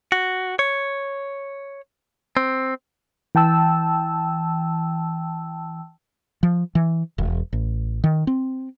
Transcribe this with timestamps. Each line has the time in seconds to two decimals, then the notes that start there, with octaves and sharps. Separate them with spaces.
0.12 F#4
0.59 C#5
2.37 C4
3.35 E3 G5 A5 E6
6.43 F3
6.75 E3
7.18 E1
7.53 A1
8.04 D#3
8.27 C4